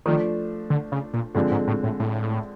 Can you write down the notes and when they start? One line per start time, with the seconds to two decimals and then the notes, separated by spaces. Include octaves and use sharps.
0.06 D#3 F3 A3 D4
0.70 D3
0.92 C#3
1.13 A#2
1.35 G2 D3 F3 G#3 C4
1.51 G#2
1.67 A2
1.83 A2
2.00 A2